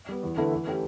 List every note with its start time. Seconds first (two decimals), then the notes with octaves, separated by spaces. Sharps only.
0.09 G3 B3
0.23 E2
0.37 D3 A3 E4 B4
0.52 E3
0.67 A3 C#4 G4